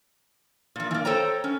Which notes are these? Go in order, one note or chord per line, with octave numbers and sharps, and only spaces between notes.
A#2 F3
E3 A#3
A4 C5 C#5 G5 A#5
C#4